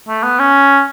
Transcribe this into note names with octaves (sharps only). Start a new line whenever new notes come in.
A3
B3
C#4